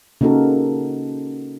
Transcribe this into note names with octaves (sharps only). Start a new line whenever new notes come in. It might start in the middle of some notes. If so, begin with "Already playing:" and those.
C#3 A#3 D#4 F#4 A4 A#4